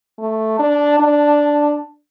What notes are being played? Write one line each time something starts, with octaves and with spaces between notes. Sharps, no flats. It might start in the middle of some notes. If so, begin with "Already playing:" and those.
A3
D4
D4